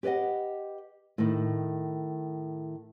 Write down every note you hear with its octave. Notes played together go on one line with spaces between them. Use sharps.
G4 B4 D5 D#5 F#5
A2 D#3